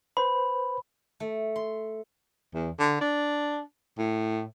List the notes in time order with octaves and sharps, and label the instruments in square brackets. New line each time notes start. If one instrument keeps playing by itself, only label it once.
[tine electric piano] B4 C5 [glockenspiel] B5
[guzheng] A3
C6
[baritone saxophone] E2
D3
D4
A2